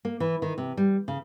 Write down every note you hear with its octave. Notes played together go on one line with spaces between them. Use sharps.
A#3
E3
D#3
C3
G3
C#3